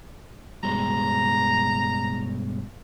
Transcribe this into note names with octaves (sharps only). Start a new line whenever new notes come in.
G2 B2 G#3 A#5